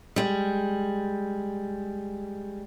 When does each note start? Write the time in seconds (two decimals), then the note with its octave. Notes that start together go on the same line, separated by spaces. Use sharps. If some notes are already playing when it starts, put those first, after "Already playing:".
0.16 G3 G#3